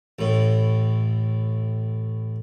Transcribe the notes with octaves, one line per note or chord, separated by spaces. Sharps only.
A1 A2